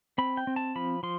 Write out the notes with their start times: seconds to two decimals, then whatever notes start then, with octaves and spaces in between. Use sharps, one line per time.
0.18 C4 B5
0.37 G5
0.47 C4
0.56 A5
0.76 F3 B5
1.03 F3 C6